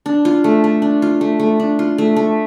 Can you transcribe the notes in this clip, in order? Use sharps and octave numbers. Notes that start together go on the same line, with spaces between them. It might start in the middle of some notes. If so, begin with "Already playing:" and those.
D4
F4
A3
A3
D4
F4
A3
A3
D4
F4
A3
A3